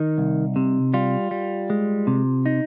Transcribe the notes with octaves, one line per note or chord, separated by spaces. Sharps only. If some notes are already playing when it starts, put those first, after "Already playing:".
Already playing: D#3 D#4
C2
C3
G3 F4
G3
G#3
C3
D#4